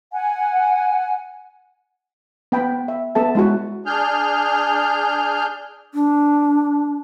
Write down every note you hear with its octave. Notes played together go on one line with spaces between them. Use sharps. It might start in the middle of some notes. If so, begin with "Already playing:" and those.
F#5 G#5
B3 G5 B5
E5
B3 A4 E5 A5
G#3 E4 F#4
D4 G#4 F6 G6
D4